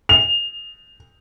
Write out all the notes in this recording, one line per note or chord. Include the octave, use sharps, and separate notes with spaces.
F7